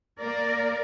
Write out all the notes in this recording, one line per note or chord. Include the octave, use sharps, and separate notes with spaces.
A#3 A#4 D5